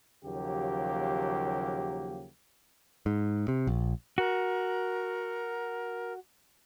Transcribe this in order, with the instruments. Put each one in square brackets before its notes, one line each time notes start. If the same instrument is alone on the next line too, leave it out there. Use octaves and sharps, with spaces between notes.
[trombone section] D#2 C#3 F3 F#3 A#3 G4
[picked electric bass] G#2
C3
A#1
[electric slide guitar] F#4 [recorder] A#4